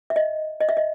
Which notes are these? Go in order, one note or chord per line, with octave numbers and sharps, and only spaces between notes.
E5
D#5
D#5
E5
D#5